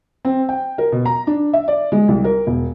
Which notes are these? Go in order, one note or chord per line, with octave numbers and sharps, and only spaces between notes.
C4
G5
A#4
B2
A#5
D4
E5
D5
G#3
C2
A#4
E1